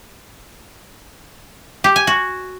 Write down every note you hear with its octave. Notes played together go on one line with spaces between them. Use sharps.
G4
G#5
F#4